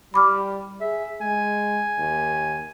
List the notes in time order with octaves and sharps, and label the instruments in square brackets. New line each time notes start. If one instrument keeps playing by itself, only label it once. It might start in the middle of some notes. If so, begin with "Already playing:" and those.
[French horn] G3 [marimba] B5 D6 F6
[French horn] G#4 [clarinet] E5
[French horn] G#3 [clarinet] G#5
[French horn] D#2